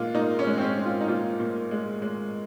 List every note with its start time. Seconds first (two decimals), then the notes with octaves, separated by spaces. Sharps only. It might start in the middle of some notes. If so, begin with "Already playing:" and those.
Already playing: A#2 G#3 F4
0.14 A#2 D#4
0.39 C#4
0.47 G#3
0.58 C4
0.61 C#4
0.77 G#3
0.86 F4
1.00 D#4
1.08 A#2 F4
1.40 A#2
1.71 G#3
2.02 G#3